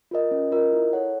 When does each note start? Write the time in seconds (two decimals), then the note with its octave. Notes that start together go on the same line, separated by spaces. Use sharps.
0.11 F4 A#4 D#5
0.31 C#4
0.52 F4 A#4 D#5
0.73 E4
0.93 A4 C#5 F#5